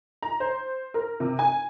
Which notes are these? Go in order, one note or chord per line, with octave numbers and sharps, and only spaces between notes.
A#5
C5
A#4
C3
G#5